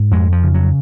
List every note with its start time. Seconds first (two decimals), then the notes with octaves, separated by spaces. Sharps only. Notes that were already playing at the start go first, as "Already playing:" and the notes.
Already playing: G#2
0.11 F2 G#3
0.32 F3
0.44 C#3
0.54 F#3